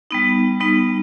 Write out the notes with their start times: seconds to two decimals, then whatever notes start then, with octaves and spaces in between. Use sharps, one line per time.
0.11 G3 B3 D#4
0.60 G3 B3 D#4